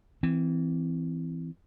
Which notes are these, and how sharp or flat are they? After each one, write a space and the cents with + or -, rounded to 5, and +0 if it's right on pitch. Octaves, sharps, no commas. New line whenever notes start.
E3 +0 C4 -20